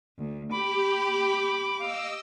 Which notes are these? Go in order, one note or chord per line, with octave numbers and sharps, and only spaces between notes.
D2
G4 B5 D6
D#5 F5 E6